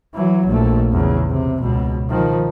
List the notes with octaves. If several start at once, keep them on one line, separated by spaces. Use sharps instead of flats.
E3 F#3
A#1 A3
E2 C#3
C3
C#2 B2
D#3 F3